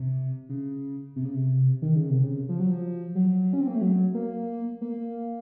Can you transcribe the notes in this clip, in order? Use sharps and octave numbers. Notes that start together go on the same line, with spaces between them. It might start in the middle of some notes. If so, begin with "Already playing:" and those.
Already playing: C3
C#3
C3
C#3
C3
D#3
C#3
C3
C#3
F3
F#3
F3
F#3
C#4
C4
A#3
A3
F#3
A#3
A#3